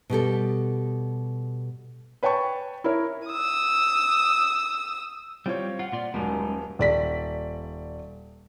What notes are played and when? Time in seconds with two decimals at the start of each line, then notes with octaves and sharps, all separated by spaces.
0.10 B2 G3 G4 A4
2.23 B4 C#5 G5 A5 C#6
2.84 E4 A#4 C#5
3.27 D#6 E6
5.46 G3 C4 F4 C#5
5.79 F4 F#5
5.92 A#2 F4 D5
6.14 D#1 F#2 G3 G#3 D#4
6.79 D#1 D5 B6